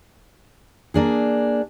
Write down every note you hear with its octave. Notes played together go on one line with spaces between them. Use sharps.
A#3 D4 G#4